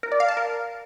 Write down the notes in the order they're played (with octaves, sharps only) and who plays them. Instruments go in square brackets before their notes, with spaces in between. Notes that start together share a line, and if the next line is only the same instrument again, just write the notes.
[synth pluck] A#4
D5
F5
A5
A#4